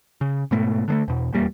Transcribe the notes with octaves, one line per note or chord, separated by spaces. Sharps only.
C#3
G#2 B2 A3
D3 G#3 A3
E2 B2
D#1 E2 G3 A#3